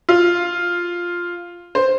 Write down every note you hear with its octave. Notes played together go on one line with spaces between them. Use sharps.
F4
C5